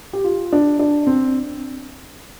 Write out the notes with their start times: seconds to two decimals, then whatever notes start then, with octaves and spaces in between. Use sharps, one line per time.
0.13 G4
0.24 F4
0.53 D4
0.79 D4
1.07 C4